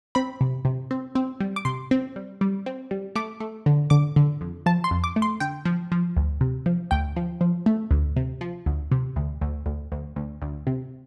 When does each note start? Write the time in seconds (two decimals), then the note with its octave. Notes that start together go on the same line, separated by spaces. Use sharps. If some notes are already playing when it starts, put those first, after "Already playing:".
0.15 C4 B5
0.41 C3
0.65 C3
0.91 C4
1.15 C4
1.40 G3
1.56 D6
1.65 C3 C6
1.91 C4
2.16 G3
2.41 G3
2.66 C4
2.91 G3
3.15 A3 D6
3.40 A3
3.66 D3
3.90 D3 D6
4.16 D3
4.41 F2
4.66 F3 A5
4.84 C6
4.91 F2
5.04 D6
5.16 A3
5.22 C6
5.40 D3 G5
5.65 F3
5.92 F3
6.17 D2
6.41 C3
6.66 F3
6.91 D2 G5
7.16 F3
7.41 F3
7.66 A3
7.91 D2
8.16 C3
8.41 F3
8.66 D2
8.92 C3
9.16 D2
9.41 D2
9.66 D2
9.92 D2
10.16 D2
10.42 D2
10.67 C3